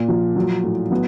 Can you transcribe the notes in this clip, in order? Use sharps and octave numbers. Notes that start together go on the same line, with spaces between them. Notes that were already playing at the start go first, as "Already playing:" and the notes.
Already playing: A#2
F3
F#3
A2
F#3 B3